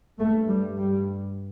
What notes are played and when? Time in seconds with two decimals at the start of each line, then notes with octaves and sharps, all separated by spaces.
0.19 G2 A3
0.48 G3
0.78 G3